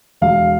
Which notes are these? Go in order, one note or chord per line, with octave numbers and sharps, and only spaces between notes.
E1 F5